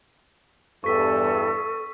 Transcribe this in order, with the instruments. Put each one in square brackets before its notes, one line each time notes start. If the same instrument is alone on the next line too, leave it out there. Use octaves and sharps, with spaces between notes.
[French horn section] E2 G2 [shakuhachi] A4 [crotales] C#6 B6